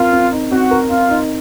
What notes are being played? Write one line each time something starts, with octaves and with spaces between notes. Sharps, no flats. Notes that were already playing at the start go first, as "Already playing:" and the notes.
Already playing: C4 F4 A#4
C4
D#4
C4 F#4
A#4
C4 F4
D#4